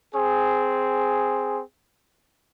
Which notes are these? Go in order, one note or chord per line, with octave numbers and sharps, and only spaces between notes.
C4 G#4